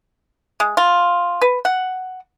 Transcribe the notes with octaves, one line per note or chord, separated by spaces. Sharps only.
G#3
F4
B4
F#5